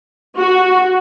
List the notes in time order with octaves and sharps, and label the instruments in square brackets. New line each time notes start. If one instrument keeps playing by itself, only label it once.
[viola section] F#4